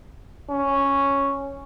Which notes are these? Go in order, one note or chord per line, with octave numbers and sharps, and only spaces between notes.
C#4